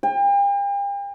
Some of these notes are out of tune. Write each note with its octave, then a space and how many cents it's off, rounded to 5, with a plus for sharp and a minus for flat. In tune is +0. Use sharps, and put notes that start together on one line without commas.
G5 +40